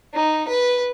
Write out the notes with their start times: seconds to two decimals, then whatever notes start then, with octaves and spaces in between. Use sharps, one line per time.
0.14 D#4
0.48 B4